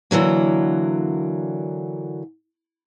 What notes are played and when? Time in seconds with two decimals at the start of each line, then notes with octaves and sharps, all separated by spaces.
0.11 D3 E3 F#3 A#3